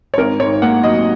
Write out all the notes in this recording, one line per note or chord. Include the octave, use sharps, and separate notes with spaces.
C#5
G#1 A#4
G#2 C#5
A#3 F#5
F#3 D#5